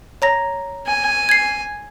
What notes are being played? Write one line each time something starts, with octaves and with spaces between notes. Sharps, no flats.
C#5 A#5 A#6
G#5
G#6 C7